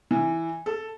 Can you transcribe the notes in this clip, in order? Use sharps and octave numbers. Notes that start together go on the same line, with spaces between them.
E3
A4